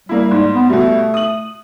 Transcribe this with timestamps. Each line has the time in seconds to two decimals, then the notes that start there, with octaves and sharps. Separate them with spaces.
0.09 G3 A#3 E4
0.31 G#2
0.54 B3
0.70 B2 G3 A3
1.14 D#6 F#7